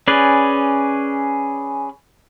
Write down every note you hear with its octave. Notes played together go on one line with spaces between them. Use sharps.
C#4 G#4 B4 D5